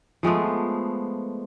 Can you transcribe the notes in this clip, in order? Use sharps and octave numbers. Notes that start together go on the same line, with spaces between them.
F3 G#3 A3 B3